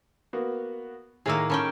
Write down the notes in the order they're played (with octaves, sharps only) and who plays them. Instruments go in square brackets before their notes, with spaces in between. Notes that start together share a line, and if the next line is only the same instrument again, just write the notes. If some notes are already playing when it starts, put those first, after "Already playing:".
[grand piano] A#3 B3 F#4
[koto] A2 D#3 A#3 [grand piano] G#4 E6
[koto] D#3 C#4 G5 [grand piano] A4 B5